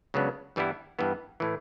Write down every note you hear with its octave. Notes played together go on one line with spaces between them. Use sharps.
C#2 C#3 F#3 B3 D4
G2 E3 G3 B3 E4
G2 E3 B3
A2 E3